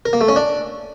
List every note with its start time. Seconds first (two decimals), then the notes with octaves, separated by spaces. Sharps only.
0.05 A#4
0.13 A#3
0.21 A3
0.29 C#4
0.36 D4